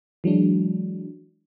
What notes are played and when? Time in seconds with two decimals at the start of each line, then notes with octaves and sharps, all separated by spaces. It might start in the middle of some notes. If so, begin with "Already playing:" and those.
0.24 E3 F#3 G#3 D4